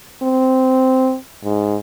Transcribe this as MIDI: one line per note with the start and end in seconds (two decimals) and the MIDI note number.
0.22 1.16 60
1.45 1.76 44